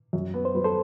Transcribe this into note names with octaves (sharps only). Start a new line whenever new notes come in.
F#2
B3
C5
F#3 B4
A4 C5